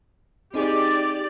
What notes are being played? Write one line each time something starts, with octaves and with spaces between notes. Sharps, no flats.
C4 D#4 G4 G#4 D5